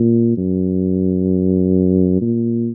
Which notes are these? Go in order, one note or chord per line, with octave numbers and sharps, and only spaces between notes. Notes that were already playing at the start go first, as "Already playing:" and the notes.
Already playing: A#2
F#2
A#2